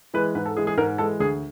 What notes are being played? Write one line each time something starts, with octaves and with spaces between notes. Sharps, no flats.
E3 G#3 B4
G#2 B4
A4
E3 G#3 G#4
G#4
G#2 A#4
E3 G#3 A4
D2 G#4